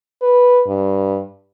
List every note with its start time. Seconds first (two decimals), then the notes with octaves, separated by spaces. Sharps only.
0.22 B4
0.67 G2